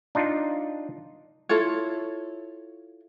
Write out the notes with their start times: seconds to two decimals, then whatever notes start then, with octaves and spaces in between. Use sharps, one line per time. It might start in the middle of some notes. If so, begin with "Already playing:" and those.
0.15 D4 D#4 F4
1.49 E4 F4 A4 C#5